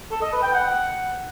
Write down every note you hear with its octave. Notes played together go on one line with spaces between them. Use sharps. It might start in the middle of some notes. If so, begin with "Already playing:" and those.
A4
D#5
B4
G5
F#5